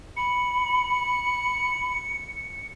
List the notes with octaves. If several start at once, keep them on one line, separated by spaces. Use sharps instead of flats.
B5 C#7